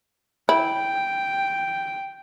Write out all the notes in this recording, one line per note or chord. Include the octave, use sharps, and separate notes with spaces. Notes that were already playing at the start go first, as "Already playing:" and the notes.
E4 G5